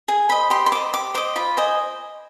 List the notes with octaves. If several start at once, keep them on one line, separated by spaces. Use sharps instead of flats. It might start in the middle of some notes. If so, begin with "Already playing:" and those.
G#4 G#5
C5 D#5 B5
G4 C6
C6
C5 D#5 D6
G4 D6
C5 D#5 D6
F4 B5
C5 D#5 G#5